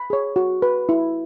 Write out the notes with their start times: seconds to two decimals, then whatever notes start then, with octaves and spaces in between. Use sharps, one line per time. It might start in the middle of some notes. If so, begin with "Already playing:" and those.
Already playing: B5
0.10 G#4 C#5
0.36 F#4
0.62 B4
0.89 E4